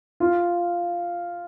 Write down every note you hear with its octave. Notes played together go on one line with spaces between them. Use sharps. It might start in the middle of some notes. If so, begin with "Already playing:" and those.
F4